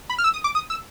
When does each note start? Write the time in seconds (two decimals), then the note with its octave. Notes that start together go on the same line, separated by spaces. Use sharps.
0.10 B5
0.18 F6
0.24 E6
0.34 D#6
0.44 D6
0.55 D#6
0.70 E6